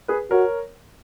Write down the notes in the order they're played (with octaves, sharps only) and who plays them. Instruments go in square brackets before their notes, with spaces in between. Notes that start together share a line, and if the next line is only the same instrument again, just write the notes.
[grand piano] G#4 B4
[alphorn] F#4 [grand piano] A#4 C#5